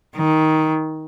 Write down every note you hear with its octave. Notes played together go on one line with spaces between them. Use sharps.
D#3